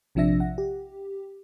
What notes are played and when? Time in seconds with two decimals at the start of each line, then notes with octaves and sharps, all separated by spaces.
0.15 A#1 C3 F3 D4 E5 A#6
0.40 F#5
0.58 G4